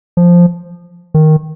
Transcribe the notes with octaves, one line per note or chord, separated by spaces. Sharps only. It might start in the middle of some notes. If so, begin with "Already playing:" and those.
F3
D#3